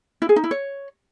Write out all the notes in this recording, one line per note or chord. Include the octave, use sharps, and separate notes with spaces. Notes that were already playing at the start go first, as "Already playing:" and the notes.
E4
G#4
D#4
E4
C#5